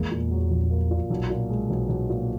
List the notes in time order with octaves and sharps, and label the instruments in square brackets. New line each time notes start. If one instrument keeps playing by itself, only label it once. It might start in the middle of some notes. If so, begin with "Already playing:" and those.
Already playing: [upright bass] E2 [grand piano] G#3 A#3
[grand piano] A#2
F#3
A#1
A#3
A#2
B1
A#2
G#3
B1
B1
A#2